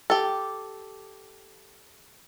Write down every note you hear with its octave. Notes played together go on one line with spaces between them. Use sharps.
G4 A4